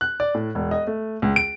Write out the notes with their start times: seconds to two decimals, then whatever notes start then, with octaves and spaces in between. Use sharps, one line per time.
0.01 F#6
0.20 D5
0.35 A2
0.55 E1
0.71 D#5
0.87 A3
1.22 C#2
1.36 D7